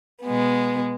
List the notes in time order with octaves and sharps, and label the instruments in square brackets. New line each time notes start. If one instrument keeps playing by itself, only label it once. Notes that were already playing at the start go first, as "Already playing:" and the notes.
[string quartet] B2 G#3 B3